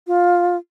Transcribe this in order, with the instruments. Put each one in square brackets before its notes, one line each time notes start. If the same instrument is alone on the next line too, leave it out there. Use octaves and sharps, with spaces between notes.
[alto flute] F4